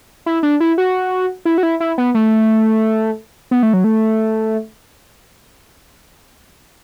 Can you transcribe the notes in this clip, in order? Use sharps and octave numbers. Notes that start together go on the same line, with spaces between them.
E4
D4
E4
F#4
E4
F#4
E4
E4
B3
A3
B3
A3
F#3
A3